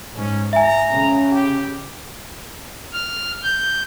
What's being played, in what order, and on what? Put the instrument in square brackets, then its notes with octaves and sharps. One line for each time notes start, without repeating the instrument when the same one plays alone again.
[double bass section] G#2 [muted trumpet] C#4
[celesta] E5 G#5 [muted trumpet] A#5
[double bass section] C#3
[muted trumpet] G4
[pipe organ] F6
G6